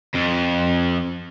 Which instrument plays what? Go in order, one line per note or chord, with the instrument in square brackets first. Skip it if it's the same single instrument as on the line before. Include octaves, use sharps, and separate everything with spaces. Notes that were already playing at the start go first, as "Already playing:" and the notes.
[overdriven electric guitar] F2